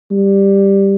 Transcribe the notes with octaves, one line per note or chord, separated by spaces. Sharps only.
G3